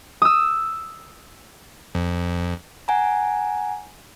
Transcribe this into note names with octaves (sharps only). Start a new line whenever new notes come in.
D#6 E6
F2
F#5 G#5 A#5